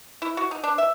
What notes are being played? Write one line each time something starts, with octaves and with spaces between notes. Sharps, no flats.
E4
F#4
D#4
D4
E5